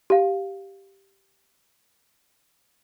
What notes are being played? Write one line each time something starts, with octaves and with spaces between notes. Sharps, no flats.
G4 F5